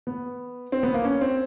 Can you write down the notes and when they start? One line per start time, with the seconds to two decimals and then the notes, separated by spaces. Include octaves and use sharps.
0.07 B3
0.72 C4
0.83 B3
0.94 A#3
1.05 C#4
1.21 C4